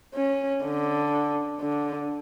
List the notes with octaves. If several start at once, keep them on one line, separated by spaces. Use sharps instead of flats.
C#4
D3
D3